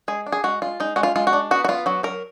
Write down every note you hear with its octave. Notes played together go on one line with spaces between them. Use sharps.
G#3 G#4
D4
G#4
G#3 F#4
G#3 F4
G#3 D#4
G#3 F#4
F4
G#3 F4
F#4
D4
B3 F#4
F#4
B3 F4
F#3 F#4
F#3 A#4